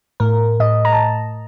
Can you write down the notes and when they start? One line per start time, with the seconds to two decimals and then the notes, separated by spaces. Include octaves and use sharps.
0.20 A2 A#4
0.60 A2 D#5
0.85 A#5
0.93 A5